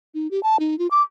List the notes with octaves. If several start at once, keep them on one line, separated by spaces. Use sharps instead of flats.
D#4
G4
A5
D#4
F4
D6